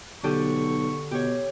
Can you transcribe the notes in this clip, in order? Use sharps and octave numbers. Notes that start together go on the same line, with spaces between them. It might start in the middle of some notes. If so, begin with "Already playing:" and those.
B1 D3 G4 A4 C#6
B2 G4 C#5